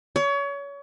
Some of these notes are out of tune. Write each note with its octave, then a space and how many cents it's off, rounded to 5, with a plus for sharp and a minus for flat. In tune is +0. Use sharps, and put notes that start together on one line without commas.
C#5 +30